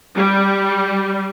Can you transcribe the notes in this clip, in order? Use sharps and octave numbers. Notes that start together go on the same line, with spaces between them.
G3